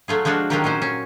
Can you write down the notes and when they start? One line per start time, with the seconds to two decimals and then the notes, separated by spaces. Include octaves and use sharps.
0.08 F#3 A3 F4 G#4
0.25 F3 G#3 D4 F4 F#4
0.50 D#3 F#3 D4 F4 G4 A#4
0.64 A#2 C#4 D#4 C5
0.82 C#4